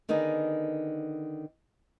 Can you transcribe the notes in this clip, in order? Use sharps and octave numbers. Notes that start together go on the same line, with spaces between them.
D3 D#3 B3 D#4 G#4